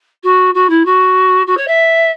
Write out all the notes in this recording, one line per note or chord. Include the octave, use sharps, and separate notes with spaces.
F#4
F#4
E4
F#4
F#4
C#5
E5